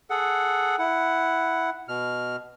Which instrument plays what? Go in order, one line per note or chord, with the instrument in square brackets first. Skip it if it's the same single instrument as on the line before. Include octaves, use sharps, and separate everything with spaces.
[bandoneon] G#4 A4 F#5
E4 F#5
B2 F6